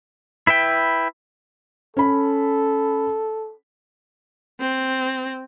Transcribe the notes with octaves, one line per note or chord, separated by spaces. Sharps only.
E4 B4 E5 G5
C#4 A4 B5
C4